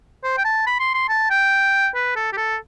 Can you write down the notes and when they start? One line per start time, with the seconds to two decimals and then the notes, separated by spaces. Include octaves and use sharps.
0.24 C5
0.37 G5
0.44 A5
0.66 B5
0.80 C6
0.94 C6
1.09 A5
1.30 G5
1.95 B4
2.16 A4
2.32 G4
2.37 A4